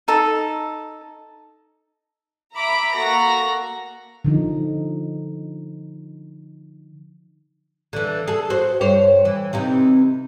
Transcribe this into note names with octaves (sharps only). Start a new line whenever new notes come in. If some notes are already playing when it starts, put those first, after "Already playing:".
D#4 A4
E5 A#5 B5 D6
A#3 F#4 A4 A#5 A#6
D3 F3 D#4
D3 E3
G#4 A4
F#4 C5
G2 C5 C#5
E3
C3 E3 D#4